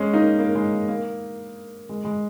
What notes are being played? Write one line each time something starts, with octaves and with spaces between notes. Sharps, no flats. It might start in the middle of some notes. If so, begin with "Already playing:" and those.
Already playing: G#3 C#4
A#3 D#4
A#3
G#3
A#3
A#3
G#3
G#3